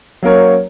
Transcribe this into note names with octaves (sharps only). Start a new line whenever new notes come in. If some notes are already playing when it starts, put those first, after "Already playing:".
F#3 A#3 C#4 A#4 C#5